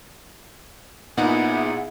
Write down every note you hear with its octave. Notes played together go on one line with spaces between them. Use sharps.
A#2 B3 D#4 E4 G#4 F#5